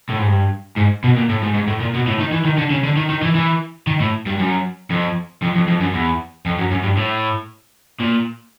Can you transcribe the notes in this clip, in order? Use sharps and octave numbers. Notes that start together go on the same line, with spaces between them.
A2
G#2
G2
G#2
B2
A#2
A2
G#2
G#2
A2
A#2
B2
A2
D#3
E3
D#3
D3
C#3
D3
D#3
D#3
E3
E3
D#3
A2
G2
F#2
F2
F2
F2
F2
F#2
E2
F2
F#2
F#2
G2
A2
A#2